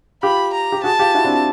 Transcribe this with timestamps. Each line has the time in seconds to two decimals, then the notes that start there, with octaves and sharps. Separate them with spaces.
0.23 F4 G4 B5
0.54 A#5
0.72 G4
0.84 F#4 G#4 A5
0.99 F4 G4
1.15 E4 F#4
1.25 C4 D4